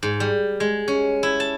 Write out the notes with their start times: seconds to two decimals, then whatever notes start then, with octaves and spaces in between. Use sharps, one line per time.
0.03 G#2
0.20 G3
0.60 G#3
0.88 C#4
1.23 E4
1.40 A5